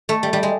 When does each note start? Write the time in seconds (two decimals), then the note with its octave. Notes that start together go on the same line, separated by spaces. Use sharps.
0.09 A3
0.23 G3
0.33 G3
0.43 G#3